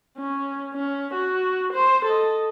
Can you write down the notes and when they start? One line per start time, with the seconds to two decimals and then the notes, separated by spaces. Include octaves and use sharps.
0.18 C#4
0.74 C#4
1.14 F#4
1.73 C5
2.05 A4 D#5